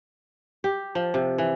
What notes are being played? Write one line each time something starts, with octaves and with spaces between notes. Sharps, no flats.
G4
F3
C3
E3